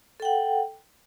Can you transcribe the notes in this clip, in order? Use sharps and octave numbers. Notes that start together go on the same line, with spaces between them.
A4 F#5 G5